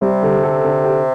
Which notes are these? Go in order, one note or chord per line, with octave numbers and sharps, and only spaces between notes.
C3 G3
D3
A4
D3
G4